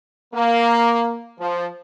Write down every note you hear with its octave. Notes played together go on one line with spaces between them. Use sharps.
A#3
F3